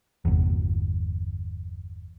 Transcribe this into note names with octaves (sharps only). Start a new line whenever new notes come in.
G1 E2